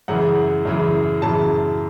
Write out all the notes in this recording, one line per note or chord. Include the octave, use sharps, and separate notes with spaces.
F#2 C#3 E3 F#5
F#2 C#3 E3
F#2 C#3 E3 A5